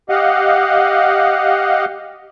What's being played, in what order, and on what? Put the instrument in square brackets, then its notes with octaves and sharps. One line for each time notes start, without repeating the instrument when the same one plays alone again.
[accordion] G4 D#5 F5 F#5